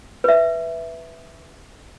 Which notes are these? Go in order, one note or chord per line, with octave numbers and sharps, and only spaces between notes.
B4 E5